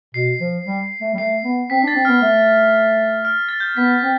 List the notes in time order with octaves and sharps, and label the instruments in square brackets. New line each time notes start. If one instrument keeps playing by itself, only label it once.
[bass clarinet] B2 [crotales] C7
[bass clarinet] F3
G3
A3
G3
[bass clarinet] A3 [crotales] C7
[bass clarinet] B3
[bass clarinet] C4 [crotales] B6
[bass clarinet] D4
[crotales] A6
[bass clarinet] C4
[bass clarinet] B3 [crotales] F6
[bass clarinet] A3
[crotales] F6
A6
G6
[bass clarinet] B3 [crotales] B6
[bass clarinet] C4